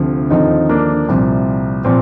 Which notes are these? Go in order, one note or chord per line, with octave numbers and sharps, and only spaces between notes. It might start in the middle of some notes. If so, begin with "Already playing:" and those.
Already playing: D2 C3 F3
D#2 D3 F3 C4 D#4
A#3 D4
C2 A#2 F3 C4
A#2 F3 C4